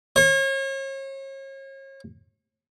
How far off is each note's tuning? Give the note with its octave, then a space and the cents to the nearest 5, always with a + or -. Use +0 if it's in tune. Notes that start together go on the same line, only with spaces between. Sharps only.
C#5 -40